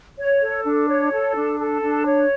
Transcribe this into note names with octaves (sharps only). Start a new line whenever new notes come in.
C#5
A4
D4
C#5
A4
D4
A4
D4
C#5